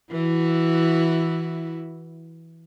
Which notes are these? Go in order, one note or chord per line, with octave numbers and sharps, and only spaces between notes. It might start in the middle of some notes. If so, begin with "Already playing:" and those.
E3 E4 F#4